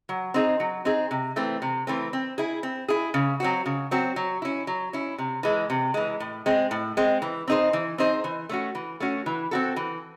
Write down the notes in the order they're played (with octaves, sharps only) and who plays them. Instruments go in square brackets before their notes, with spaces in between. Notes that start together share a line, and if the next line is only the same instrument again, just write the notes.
[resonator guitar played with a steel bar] F#3
C4 D#4 G#4
F#3
C4 D#4 G#4
C3
E3 A3 C4
C3
E3 A3 C4
C4
E4 G#4
C4
E4 G#4
C#3
F#3 C4 F#4
C#3
F#3 C4 F#4
F#3
C#4 E4
F#3
C#4 E4
C3
E3 G#3
C3
E3 G#3
A2
G#3 C4
A2
G#3 C4
E3
C4 D#4 G#4 C5
E3
C4 D#4 G#4 C5
E3
A3 C#4 F#4
E3
A3 C#4 F#4
E3
C4 F#4 A4
E3